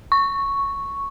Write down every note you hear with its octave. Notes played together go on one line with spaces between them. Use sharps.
C#6